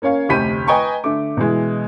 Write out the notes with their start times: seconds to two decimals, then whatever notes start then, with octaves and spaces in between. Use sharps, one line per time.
0.02 A#3 C#4 C#5 F5
0.29 F1 D2 G4 B5 B6 D#7
0.67 B4 D#5 G5 G#5 A#5 C#6
1.04 D3 A3 D6
1.37 B2 E3 G#3